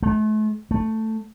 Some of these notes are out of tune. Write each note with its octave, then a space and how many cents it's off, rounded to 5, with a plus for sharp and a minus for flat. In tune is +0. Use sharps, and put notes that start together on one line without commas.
A3 -40
A3 +5